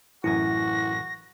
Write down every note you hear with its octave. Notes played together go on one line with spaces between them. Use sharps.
A1 F#2 E4 F#4 G#5 A#6